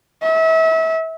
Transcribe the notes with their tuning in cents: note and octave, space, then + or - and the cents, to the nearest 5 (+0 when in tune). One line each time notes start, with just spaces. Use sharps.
E5 -35